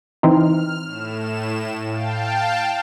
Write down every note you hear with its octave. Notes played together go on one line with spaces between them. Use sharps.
E3 C4 D#4 F6
A2 E7
F5 G5 A5